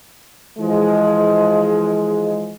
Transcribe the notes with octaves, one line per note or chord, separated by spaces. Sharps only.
E3 F3 G#3